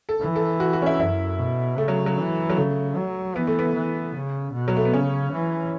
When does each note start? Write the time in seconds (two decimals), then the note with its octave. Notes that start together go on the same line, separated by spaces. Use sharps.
0.09 A4
0.21 E3
0.36 A4
0.60 F#4
0.73 F#4
0.82 C#4
0.86 E4
1.00 F#2 E4
1.39 B2
1.78 C#3 A3
1.88 F#3
2.06 F#3
2.18 E3
2.50 F#3
2.57 C#3 A3
2.96 F#3
3.36 E3 B3
3.47 A3
3.59 B3
3.75 E3
4.15 C#3
4.53 B2
4.68 F#3
4.77 A3
4.85 B3
4.93 C#3 C#4
5.32 E3